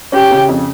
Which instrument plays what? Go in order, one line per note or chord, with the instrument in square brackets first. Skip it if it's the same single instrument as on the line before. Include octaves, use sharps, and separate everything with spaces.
[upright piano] C#4 [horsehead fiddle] G4
[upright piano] C#3
F2